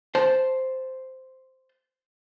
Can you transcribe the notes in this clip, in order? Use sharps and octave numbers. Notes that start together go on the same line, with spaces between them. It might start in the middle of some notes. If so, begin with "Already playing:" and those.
C5 A5